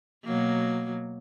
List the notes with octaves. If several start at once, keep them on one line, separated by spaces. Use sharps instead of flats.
B2 F#3 A#3